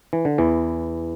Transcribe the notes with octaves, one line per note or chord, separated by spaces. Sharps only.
E3
D3
E2 E3